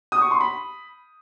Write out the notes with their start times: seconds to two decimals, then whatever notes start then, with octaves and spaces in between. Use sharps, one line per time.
0.12 D#6
0.22 C#6
0.31 C6
0.41 B5